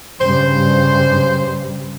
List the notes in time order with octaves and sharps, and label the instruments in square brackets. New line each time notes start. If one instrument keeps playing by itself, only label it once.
[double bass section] G2 C#3 G3 [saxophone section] C5